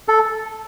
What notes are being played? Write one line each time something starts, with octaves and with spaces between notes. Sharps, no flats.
A4